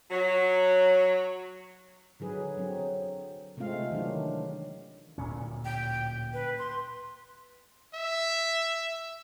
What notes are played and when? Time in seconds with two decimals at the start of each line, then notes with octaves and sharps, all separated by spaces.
0.10 F#3
2.20 D3 F#3 G#4 B4
2.57 F#3 C4
3.57 C3 G#3 A3 C4 F4 F5
3.91 D#3 E3 F#3 D4
5.18 D1 A#2 C#4
5.65 G5
6.33 B4
6.59 C6
7.94 E5